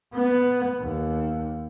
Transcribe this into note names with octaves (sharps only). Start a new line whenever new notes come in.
B3
D#2